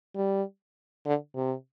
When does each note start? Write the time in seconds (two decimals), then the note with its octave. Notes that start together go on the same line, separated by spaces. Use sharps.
0.16 G3
1.06 D3
1.35 C3